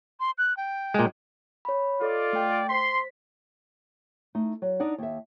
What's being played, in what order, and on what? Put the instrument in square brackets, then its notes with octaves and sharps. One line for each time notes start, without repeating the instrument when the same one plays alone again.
[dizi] C6
F#6
G5
[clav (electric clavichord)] A#2 G#3
[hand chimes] C#5 B5
[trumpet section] F4 D5 [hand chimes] A4 D#5
[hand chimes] A3 G5
[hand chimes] C5 B6 [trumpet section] C6
[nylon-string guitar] A3 D#4
F#3
D4 D#4 D5 F#5
D#2 E5